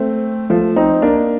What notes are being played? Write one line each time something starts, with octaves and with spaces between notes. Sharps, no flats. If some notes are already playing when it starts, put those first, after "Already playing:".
Already playing: A3 C4
F3 A3
C4 D#4
A#3 D4